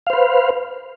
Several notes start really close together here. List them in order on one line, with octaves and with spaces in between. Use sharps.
F5 C5 B4